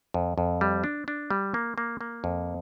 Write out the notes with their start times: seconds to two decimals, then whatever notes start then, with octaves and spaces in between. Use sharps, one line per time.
0.14 F2
0.38 F2
0.61 G3
0.84 D4
1.08 D4
1.30 G3
1.54 A#3
1.78 A#3
2.01 A#3
2.24 F2